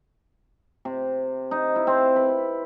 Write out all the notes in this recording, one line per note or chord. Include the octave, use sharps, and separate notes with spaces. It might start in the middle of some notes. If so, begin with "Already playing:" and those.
C3
D#4
E4
C4
B4